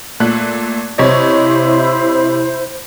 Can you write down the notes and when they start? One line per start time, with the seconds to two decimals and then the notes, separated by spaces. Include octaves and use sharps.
0.20 A#2 A3 F#6
0.98 C3 E4 C5 C#5 D#5